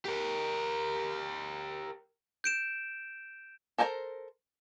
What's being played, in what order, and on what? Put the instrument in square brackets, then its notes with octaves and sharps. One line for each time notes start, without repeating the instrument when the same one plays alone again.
[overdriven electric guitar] G4 A#4
[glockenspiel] G6 D7 E7
[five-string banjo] A4 A#4 C5 G#5 A#5